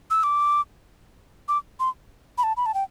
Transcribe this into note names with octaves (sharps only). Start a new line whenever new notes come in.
E6
D6
D6
C6
B5
A5
B5
A5
G5